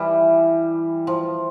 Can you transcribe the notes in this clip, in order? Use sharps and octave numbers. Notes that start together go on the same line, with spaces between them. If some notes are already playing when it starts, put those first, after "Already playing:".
Already playing: E3 G3
F3